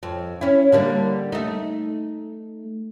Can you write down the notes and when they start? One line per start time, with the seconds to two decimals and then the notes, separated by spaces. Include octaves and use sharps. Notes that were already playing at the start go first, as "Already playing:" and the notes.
0.03 F2
0.41 C#4 E4
0.72 D3 G3 A#3
1.32 A3 D#4